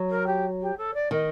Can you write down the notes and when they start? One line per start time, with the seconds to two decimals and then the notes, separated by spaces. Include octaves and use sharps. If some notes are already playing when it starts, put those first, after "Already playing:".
Already playing: F#3
0.09 A#4
0.26 G4
0.61 G4
0.77 A4
0.94 D5
1.11 D#3 D#5